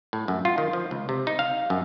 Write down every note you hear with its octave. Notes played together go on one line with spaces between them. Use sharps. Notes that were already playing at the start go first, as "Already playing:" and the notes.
A2
F#2
F4
D#3
F3
C#2
C3
D#4
F5
F#2